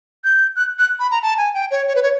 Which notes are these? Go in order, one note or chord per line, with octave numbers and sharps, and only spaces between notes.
G6
F#6
F#6
B5
A#5
A5
G#5
G5
C#5
C#5
B4
C#5